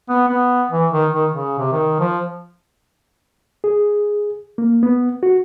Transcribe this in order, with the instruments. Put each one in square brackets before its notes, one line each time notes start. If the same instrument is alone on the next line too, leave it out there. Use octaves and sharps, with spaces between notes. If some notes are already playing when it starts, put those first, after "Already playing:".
[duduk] B3
B3
E3
D#3
D#3
C#3
C3
D#3
F3
[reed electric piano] G#4
A#3
B3
F#4